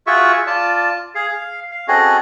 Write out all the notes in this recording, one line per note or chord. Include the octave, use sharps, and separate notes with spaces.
F4 F#4 G#4 E5 C#6
F4 D5 A5
G#4 F5
F5
F5
C4 C#4 F#4 G#4 A4 D#5